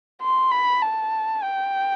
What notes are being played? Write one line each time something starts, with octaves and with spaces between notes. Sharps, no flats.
C6
B5
A5
G5